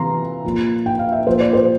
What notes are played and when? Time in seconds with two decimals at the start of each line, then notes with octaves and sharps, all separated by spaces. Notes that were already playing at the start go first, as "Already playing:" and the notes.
Already playing: C3 E3 F5 A#5 C6
0.44 A#2 F3
0.86 G5
0.99 F5
1.12 E5
1.26 A#2 F3 C5
1.40 D5
1.53 C5